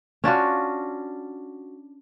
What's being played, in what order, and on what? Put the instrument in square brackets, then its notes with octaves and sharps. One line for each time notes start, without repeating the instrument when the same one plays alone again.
[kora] C#4 D4 F4 F#4